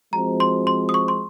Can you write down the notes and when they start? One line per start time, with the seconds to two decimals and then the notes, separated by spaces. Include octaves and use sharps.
0.13 F3 G#3 C4 F#4 A#5
0.40 C6
0.67 C6
0.89 D#6
0.94 C#6
1.08 C6